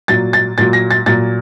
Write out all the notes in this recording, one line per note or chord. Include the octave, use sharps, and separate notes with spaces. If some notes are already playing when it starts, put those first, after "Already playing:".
A#2 F#3 A6
A6
A#2 F#3 A6
A#6
A6
A#2 F#3 A6